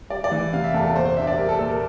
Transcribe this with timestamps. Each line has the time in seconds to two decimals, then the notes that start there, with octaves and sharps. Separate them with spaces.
0.10 G3 D5
0.24 D5
0.31 E3
0.53 C3 F5
0.64 E5
0.74 E2 A4
0.85 A4
0.96 A#2 C5
1.06 C5
1.16 D4 E5
1.27 D5
1.38 G3 A#4
1.49 A4
1.59 A#2 A4
1.69 A#4